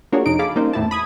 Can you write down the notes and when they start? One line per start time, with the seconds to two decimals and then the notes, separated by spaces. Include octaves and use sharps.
0.12 A#3 D4 F4 F#4 G#4 C#5
0.26 F2 C3 D#4 D7
0.39 G#4 A4 F5 B5 D6
0.55 G3 A#3 C#4 D#4 C5
0.73 E2 A2 E4 A5
0.91 B5 D#6 G#6